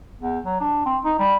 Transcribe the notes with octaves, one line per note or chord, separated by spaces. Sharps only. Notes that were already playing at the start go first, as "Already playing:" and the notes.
E2
F#3
D4
C4
D#4
G3